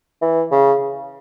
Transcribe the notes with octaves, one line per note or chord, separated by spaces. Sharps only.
E3
C#3